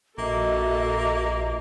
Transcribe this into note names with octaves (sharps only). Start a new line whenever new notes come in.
A#1 A#3 F#4 A4 D#5 E5